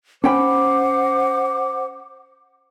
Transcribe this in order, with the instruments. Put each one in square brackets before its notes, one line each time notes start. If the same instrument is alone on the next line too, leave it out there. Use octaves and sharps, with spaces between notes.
[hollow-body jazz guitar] C#4 G5 B5 [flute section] C5 F#5 D6